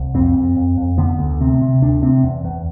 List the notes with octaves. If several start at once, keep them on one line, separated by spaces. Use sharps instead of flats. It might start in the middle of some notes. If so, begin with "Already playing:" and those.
Already playing: C2
F2 C4
F2
F2
F2
D3 B3
D2
C3 C4
C3
D2 D4
C3 C4
E2
E2